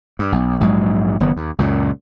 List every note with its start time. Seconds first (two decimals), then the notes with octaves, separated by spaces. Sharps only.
0.19 G2
0.32 B1
0.60 A#1 G#2 F#3 G#3
1.20 F#1 D#3 B3
1.37 D#2
1.58 C#2 F#2 A#2